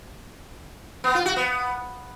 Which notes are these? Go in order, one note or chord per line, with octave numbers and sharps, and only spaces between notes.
B3
F4
F#4
B3